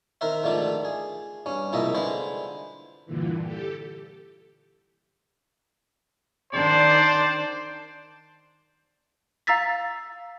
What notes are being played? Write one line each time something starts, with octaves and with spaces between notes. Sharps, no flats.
D#3 A#4 C5 E5
G#2 D3 D#3 F3 A3 D4
G#4
G2 C#4
C2 G#2 F3 A#3 D#5 E5
D3 G#3 B4 C5
G2 A#2 D3 E3
G4 A4
D#3 D4 C5 D5
F5 A#5 E6 A6 B6